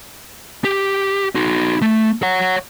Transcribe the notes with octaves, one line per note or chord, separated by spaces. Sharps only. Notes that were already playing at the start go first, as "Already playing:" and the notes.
G4
D#4 F#4
A3
C#5 F#5